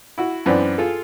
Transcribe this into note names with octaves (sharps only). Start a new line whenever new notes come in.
E4 F#4
F#2 E3 B3 C4 D4
F4 G#4 A4